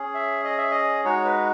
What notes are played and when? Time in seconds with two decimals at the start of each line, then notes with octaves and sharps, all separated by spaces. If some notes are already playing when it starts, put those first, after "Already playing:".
Already playing: C#4 G#4
0.14 E5
0.44 D#5
0.58 E5
0.71 D#5
1.04 G#3 D#4 F#4 C#5
1.25 B4